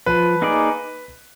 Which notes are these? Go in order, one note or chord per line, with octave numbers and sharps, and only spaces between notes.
F3 B4
A#3 D#4 G#4 D5